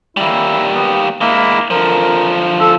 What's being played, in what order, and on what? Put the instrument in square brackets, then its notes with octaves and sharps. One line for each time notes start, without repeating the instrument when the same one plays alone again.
[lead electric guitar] G3 A#3 [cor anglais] E4
[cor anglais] B3
[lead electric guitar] G#3 E4 [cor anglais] A#3
[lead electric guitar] D3 F3 [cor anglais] A#4
[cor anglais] A4